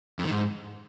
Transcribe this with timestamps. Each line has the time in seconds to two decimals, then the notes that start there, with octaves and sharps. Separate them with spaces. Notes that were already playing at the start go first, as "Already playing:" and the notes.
0.19 F2
0.25 D#3
0.31 G#2